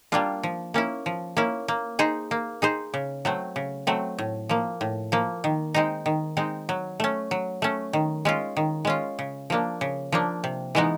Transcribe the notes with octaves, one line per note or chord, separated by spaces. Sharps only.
G3 A#3 D4 F4
F3
A#3 C#4 E4
F3
A#3 C#4 E4
A#3
D#4 G#4 C5
A#3
D#4 G#4 C5
C#3
F#3 A3 C4
C#3
F#3 A3 C4
A2
F3 A#3
A2
F3 A#3
D#3
G#3 C4 D#4
D#3
G#3 C4 D#4
F#3
A3 C#4
F#3
A3 C#4
D#3
G#3 C#4 F4
D#3
G#3 C#4 F4
C#3
F3 A#3 D4
C#3
F3 A#3 D4
C3
E3 G#3 B3 D#4